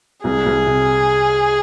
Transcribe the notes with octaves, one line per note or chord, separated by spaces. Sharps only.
C2 G#4
C2
C3